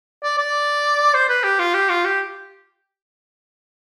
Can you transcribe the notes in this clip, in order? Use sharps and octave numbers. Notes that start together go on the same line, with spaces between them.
D5
D5
C5
B4
G4
F4
G4
F4
G4